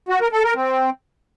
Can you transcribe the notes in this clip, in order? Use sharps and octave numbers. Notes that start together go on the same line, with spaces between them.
F#4
A#4
A4
A#4
C4